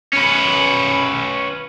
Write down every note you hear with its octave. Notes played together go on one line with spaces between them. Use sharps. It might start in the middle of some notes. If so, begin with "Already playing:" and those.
C#4 B4